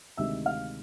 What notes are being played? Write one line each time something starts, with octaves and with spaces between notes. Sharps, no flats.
D2 C3 D#3 G#3 E5 E6
F5 F6